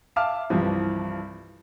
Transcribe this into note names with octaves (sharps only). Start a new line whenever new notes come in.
E5 F5 A5 D6 F6
C2 G2 E3 F3